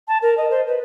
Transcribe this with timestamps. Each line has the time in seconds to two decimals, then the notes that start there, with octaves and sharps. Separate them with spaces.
0.08 A5
0.22 A#4
0.37 D#5
0.51 C5
0.67 B4